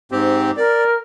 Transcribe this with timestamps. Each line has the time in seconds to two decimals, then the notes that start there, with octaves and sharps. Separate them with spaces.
0.12 G#2 C4 G4
0.57 A#4 D5